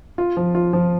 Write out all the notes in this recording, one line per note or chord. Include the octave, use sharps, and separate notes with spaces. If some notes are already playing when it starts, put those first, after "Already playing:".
F4
F3
F4
F3